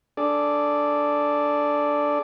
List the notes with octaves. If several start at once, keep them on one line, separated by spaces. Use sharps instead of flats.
D4 G#4 A4 D5